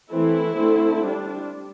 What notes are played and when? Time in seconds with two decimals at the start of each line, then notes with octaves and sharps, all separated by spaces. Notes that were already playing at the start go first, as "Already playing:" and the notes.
0.09 E3 A3 C4 E4
0.56 D3 A3 C4
1.03 G3 D4